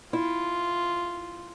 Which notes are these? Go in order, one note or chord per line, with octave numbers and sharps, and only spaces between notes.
E4 F4